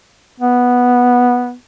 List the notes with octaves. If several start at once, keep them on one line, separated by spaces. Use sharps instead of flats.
B3